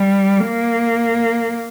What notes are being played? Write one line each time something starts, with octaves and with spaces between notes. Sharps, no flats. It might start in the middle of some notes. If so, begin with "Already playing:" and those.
Already playing: G3
A#3